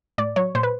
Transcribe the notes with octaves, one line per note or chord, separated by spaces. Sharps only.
A2 D5
F#3 C#5
A#2 C5
B4